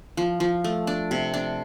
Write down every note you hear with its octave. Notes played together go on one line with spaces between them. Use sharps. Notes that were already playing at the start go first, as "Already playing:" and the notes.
F3
F3
A3
D4
C3
D4